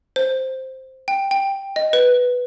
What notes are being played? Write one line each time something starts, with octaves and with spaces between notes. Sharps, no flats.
C5
G5
G5
D#5
B4